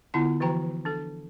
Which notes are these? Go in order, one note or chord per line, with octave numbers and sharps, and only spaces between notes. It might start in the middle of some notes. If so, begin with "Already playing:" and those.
D3 B3 E4 F4 F#5 A5
E3 F3 F#4 C5 G5 A#5
D4 A4